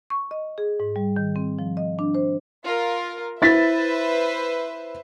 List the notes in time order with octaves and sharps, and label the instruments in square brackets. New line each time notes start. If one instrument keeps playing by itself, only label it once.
[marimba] C#6
D#5
G#4
G#2
G3
D#3
C4
F3
D#5
D4
C5
[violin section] F4 A#4
[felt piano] E4 A6 B6 [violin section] B4 C5 E5